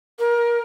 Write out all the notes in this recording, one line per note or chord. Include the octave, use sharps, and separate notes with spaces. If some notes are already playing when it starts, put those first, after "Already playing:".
A#4